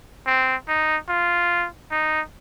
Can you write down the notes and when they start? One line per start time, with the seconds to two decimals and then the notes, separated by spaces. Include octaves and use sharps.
0.27 C4
0.68 D#4
1.09 F4
1.92 D#4